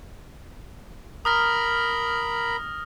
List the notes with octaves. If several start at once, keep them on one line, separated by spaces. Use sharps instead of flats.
A#4 A#5 B5 D#6 F6 A#6